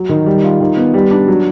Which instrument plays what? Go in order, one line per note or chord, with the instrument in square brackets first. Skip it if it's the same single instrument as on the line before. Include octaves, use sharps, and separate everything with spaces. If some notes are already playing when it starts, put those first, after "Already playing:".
Already playing: [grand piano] F#3
D#3
G3
F4
D#3
B3
G3
D4
F#3